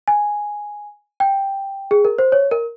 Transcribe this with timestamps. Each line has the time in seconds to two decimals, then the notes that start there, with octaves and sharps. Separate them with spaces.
0.08 G#5
1.20 G5
1.91 G#4
2.05 A#4
2.19 C5
2.32 C#5
2.51 A#4